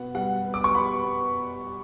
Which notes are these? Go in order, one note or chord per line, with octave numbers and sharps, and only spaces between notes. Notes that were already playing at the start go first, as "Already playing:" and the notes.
Already playing: B2 B3 F#5
G3 F#5
B3
D6
C#6
B3 B5
B3